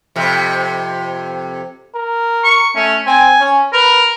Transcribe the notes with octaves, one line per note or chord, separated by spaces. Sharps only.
F2 C3
A#4
C#6
A3 C#4
C4 G#5
C#4
A#4 B4